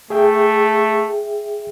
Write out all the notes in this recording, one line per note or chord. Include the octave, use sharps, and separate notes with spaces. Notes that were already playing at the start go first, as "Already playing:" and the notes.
A3 G#4 E5 G5